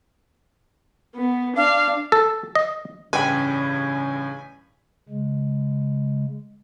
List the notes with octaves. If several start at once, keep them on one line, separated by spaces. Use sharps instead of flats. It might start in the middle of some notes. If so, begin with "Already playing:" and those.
B3
D4 F5
A4
D#5
A1 G2 C#3 B4 G5 G#5 B5
C#3 G#3